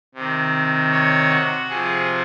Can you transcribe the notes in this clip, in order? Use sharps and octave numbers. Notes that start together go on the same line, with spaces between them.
C3 D#3
C#5
F#4
C3 F3 G#4